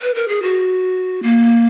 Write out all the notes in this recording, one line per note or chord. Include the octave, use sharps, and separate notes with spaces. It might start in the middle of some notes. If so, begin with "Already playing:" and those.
B4
A#4
G#4
F#4
A#3